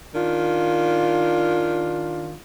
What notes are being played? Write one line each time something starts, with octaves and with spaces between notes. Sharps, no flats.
D#3 D4 F4